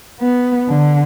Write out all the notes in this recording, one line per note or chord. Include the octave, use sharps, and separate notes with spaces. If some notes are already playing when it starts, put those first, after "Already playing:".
B3
D3